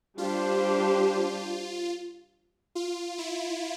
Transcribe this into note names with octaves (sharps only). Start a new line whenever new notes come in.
G3 D4 F4 G4 C5
F4
E4